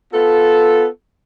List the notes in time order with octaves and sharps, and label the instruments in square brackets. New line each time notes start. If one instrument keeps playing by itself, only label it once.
[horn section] B3 F4 A4